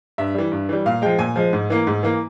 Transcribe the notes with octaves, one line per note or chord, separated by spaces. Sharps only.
G2 E5
E3 G3
G2
E3 G3
A#2 F5
F3 G#3 G5
A#2 G#5
F3 G#3
G#2
E3 A#3
G#2
E3 A#3